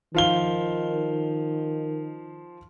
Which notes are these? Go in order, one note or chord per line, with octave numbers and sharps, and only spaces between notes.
D#3 F3 F5 G7